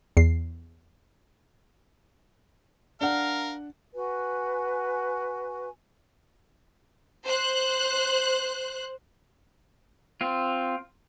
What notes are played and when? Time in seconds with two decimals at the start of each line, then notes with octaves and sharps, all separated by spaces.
0.17 E2 C7
3.01 D4 A#4 F5 F#5
3.94 F#4 B4 G#5
7.25 C5 F#6
10.21 C4 F4